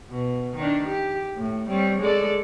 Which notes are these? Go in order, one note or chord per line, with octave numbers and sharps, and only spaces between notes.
B2
D#3 D4
G4
A2
G3 C4 C#5
G#3 A4 D5